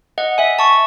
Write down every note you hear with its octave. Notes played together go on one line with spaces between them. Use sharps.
D#5 F#5
E5 G#5
A5 C#6